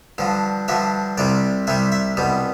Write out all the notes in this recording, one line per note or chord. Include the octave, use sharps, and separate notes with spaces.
G2 D3 F3
G2 D3 F3 E5
C2 C3 G3 D5
C2 C3 G3 E5
E5
C2 B2 G3